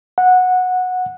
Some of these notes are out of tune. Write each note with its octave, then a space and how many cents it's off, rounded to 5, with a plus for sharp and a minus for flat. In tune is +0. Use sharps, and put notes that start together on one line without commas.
F#5 -15